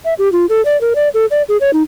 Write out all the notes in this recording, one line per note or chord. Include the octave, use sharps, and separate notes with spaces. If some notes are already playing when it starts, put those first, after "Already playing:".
E5
G4
F4
A4
D5
A#4
D5
A4
D5
G#4
C#5
D#4